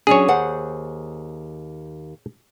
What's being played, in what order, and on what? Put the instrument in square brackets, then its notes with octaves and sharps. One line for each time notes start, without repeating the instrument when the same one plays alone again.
[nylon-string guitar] F#3 C#4 D4 [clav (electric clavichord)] G#4 C#5
[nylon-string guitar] D#2 C5 F#5